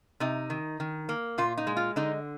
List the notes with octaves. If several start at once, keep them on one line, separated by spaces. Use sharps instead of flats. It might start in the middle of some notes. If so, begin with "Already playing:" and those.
C3 D#4
D#3
D#3
A#3
A#2 F4
D#4
G#3
F4
D3 D#4